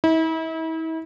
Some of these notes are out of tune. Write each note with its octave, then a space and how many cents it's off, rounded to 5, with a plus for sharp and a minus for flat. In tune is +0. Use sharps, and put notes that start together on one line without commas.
E4 -40